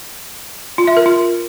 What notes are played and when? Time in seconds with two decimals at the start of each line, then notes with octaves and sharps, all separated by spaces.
0.78 F4
0.87 E5
0.97 A#4
1.06 F4